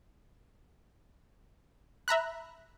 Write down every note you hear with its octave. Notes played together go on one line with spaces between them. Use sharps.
E5 A#5 B5 F#6